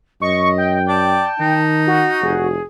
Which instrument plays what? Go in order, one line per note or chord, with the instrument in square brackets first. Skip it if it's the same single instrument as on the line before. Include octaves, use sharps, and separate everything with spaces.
[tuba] F#2 [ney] D#5 [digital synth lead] C#6
[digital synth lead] G5
[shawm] D5 [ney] A5
[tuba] D#3 [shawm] D#4
[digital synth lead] F#4
[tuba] F1 [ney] G#4